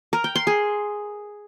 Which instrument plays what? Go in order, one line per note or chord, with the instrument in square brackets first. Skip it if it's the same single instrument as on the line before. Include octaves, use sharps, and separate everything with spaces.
[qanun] A#4
G5
C6
G#4